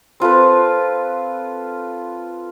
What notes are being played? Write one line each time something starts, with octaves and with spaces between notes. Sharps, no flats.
C4 F4 A4 B4